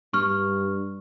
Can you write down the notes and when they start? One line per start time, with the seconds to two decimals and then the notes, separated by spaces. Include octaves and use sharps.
0.13 G2 C#6 F6